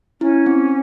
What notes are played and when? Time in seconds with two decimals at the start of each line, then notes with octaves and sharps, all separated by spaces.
0.21 C#4 E4
0.46 C4